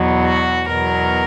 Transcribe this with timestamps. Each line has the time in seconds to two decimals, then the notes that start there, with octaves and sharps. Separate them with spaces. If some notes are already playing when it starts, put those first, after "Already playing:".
Already playing: E2 B2 F#3
0.24 F#4
0.68 E2 B2 F#3 A#4